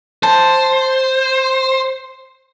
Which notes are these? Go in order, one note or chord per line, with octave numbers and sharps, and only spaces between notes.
C5 A5